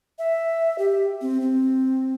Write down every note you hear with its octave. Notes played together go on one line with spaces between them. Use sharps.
E5
G4
C4
C4